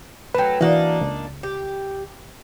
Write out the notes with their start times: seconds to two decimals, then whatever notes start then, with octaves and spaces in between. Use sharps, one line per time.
0.35 F#3 A3 B4 G5
0.61 E3 A#3 D4 D#4 F#4
1.01 C#2
1.43 G4